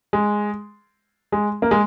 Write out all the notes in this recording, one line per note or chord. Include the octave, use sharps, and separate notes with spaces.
G#3
G#3
A#3
G#3